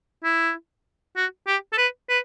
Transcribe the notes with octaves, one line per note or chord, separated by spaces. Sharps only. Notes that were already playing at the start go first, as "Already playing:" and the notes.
E4
F#4
G4
A4
B4
B4